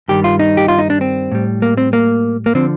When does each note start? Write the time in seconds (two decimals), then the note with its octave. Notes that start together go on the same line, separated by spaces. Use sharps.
0.08 G2 D#3 G3 G4
0.24 F4
0.39 D#4
0.57 G4
0.68 F4
0.79 D#4
0.90 D4
1.01 C4
1.32 A2 G3
1.62 A#3
1.77 C4
1.93 A#3
2.46 A#3
2.55 D3 F3 C4